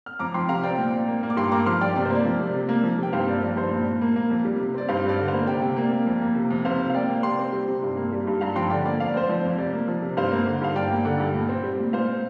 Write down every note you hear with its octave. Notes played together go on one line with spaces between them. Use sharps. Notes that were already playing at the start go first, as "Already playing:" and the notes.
F6
F2 A#5 D6
F3 G5 C6
C3 F5 A#5
C4 D5 G5
A#2
A#2
A#3
A#3
D6
G2 G5 C6
A#3 A#5 D6
F3 C6 F6
G2 D5 G5
C3 D5
C5
A#3 D5
F3
C3
C3
A#3
F3
C3 G5
G2 C5 F5
A#3 D5
F3 D5
G2 C5
A#2
A#2
A#3
A#3
F2
G3
C3
C4 D5
G2 C5 F5
G3
D5
D3
C5 F5
A#3
C3 D5 G5
C3
A#3
A#3
F2
A#3
C3
F2
C3 C5 F5
C3
F5
A#3 D5 G5
A#3
C3 G5 C6
C4
G3
C3
G2
A#3
G3
G2
G2 F5 A#5
F3 G5 C6
D3 D5 G5
A#3 D5
F2 F5
D5
C4 C5
F3 D5
F2
C3 D5
A#3
F3
C3
G2 C5 F5
A#3
D3
G2 F5
G2 D5 G5
A#3
D3
G2
A#2
C4
G3
A#2
A#2 C5 F5
C4